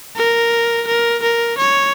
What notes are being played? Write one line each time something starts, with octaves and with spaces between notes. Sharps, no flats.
A#4
A#4
A#4
C#5